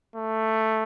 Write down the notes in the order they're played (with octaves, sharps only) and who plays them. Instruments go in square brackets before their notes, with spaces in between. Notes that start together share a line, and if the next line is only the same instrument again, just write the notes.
[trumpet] A3